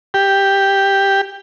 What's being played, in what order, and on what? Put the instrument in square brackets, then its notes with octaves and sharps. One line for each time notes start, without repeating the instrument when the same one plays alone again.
[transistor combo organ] G4